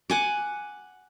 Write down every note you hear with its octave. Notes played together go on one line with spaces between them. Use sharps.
F#5 G#5 D6